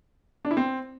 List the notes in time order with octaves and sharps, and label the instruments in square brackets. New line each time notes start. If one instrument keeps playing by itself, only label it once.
[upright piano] D4
E4
C4